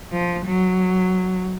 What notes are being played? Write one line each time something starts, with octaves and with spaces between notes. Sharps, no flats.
F3
F#3